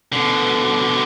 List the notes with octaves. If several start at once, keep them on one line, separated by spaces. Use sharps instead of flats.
B2 D3